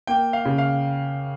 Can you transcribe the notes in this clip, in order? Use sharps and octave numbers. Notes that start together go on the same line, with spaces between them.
A#3 G5
F5
C#3
F5